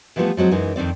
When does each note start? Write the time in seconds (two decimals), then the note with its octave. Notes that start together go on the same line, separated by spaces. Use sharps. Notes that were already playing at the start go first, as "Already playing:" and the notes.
0.16 E3 F3 G3 A3 B3 F4
0.37 F3 F#3 G#3 C4
0.51 F#2 E3 G#3 D#4
0.76 F2 D#3 C4 D5